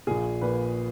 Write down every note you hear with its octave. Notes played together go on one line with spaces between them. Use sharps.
A#1 A#2 G#4
A#1 A#2 B4